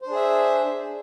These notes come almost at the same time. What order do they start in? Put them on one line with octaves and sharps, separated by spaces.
C5 D4 G#4 E5